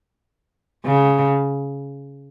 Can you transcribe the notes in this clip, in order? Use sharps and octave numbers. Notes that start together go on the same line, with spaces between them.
C#3